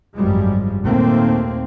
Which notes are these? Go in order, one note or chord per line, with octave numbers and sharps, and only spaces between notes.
G#1 F#2 F3 G3 G#3
D#2 A#2 A3 A#3 C4